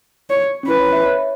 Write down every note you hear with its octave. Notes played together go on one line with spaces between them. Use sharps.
C#5
C#4
E4 B4
C#5
E5
C#5